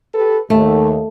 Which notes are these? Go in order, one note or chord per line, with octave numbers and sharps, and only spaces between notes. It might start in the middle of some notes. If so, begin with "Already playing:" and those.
G4 A4 B4
D#2 A3